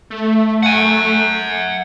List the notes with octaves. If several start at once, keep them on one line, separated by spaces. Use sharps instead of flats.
A3
F#5 G#5